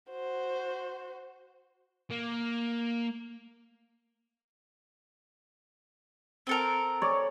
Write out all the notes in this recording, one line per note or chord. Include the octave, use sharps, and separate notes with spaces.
F#4 C5
A#3
C4 A4 A#4
C#5 D5